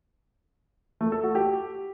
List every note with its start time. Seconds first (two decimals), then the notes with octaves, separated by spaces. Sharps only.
1.01 A3
1.12 A4
1.23 F#4
1.35 G4